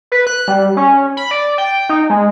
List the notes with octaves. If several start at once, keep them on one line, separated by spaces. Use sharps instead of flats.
B4
F#6
G3
C#4
B5
D5
G5
D#4
G#3